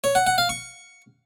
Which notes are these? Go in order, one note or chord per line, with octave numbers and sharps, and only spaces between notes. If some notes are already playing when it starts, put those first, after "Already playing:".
C#5
F#5
F#5
F5
C#6